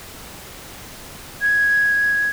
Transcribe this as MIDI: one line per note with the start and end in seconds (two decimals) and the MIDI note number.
1.42 2.30 92